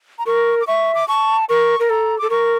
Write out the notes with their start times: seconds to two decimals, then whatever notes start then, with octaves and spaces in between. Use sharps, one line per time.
0.19 A#5
0.26 A#4 C#6
0.61 D6
0.67 E5 C#6
0.95 D6
1.08 A5 C#6
1.49 A#4 C#6
1.79 A#4
1.90 A4 A#5
2.18 A4 D6
2.30 A#4 C#6